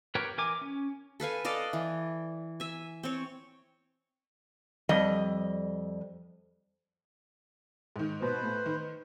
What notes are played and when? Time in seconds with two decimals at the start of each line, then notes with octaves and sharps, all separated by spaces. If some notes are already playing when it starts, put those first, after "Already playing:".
0.15 G4 A#4 B4 C#5 G5
0.38 E3 A#4 G#5 D6
0.61 C#4
1.20 A4 B4 F5 G#5
1.45 A4 D5 D#5 F5
1.73 E3
2.60 E5 G#5
3.03 C4 C#5
4.89 F2 G3 D#5
7.96 G#2 D#3
8.22 B2 B4 C5
8.43 A2
8.66 D#3